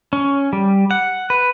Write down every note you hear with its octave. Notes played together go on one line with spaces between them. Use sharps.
C#4
G3
F#5
B4